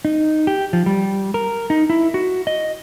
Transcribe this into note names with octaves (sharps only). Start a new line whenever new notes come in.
D#4
G4
F3
G3
A#4
D#4
E4
F#4
D#5